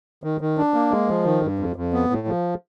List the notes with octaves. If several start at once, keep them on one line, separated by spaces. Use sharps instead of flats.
D#3
D#3
D4
A#3
G#3
F3
D#3
G2
F2
F2
B3
A2
F3